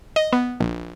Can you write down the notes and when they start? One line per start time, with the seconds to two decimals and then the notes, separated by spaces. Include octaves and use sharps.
0.16 D#5
0.33 B3
0.60 A#1